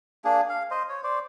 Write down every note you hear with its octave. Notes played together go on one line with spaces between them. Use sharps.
A#3 D4 G#4
F5
C5 D#5
C#5
C5 D5